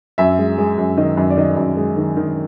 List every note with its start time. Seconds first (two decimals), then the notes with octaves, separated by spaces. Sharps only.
0.18 F#2 E5
0.39 G#3
0.58 G#3
0.78 F#2
0.97 D#3 D#5
1.17 F#2
1.30 D5
1.37 D#3 D#5
1.57 F#2
1.77 G#3
1.97 D#3
2.17 D#3